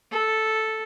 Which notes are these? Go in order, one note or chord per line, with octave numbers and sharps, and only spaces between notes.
A4